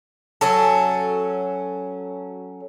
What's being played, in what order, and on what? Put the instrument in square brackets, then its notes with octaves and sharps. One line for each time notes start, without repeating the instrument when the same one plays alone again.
[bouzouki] F#3 C#4 A4